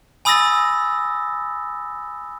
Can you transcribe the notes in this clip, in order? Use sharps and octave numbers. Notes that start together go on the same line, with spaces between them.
G#5 B5 D#6 E6 A6 A#6